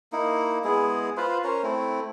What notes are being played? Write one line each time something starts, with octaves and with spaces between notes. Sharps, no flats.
A#3 D#4 E4
G#3 B3 E4 G#4
F4 B4 C5
C#4 A#4 C5 C#5
A3 C4 E4